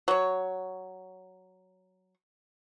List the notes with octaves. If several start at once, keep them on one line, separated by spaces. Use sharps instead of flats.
F#3 C#5